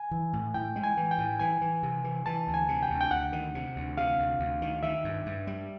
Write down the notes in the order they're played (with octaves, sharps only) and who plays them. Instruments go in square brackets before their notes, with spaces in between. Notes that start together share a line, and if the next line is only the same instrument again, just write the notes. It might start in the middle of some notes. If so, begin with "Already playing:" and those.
Already playing: [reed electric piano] G#5
[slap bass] E3
A2
[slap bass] A2 [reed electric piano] G5
[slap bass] G#3
[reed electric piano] G#5
[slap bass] E3
[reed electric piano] G5
[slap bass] A2
[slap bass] E3 [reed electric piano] G#5
[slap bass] E3
C3
E3
[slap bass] E3 [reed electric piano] A5
[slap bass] D2
[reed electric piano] G#5
[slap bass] C3
[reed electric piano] G5
[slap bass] D2
[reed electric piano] G5
[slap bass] D2 [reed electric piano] F#5
[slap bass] D#3
C3
D2
[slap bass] C3 [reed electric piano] F5
[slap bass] D2
D2
D#3
[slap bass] D#3 [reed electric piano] E5
[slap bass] G2
G2
G3